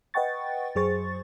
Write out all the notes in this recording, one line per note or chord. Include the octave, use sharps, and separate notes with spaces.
B4 D#5 F#5 G5 C#6 A6
F#2 F#3 G#4 C5 C#6 A6